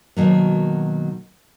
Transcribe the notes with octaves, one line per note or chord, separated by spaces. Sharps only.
B2 D#3 F#3 A#3